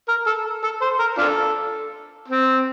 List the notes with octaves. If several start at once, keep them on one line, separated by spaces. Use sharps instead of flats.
A#4
A4
A4
C5
A#4
D4 F4 A4
C4